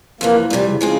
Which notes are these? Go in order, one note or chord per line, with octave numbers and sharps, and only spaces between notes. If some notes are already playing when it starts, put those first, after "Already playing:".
F2 C3 E3 A#3
F2 C3 E3 G3
C#3
C#3 F3 G#3 C4